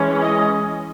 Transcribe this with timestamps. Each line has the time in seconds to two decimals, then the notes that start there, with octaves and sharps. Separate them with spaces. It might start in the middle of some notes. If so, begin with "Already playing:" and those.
Already playing: E3 G#3 C#4
0.21 D#5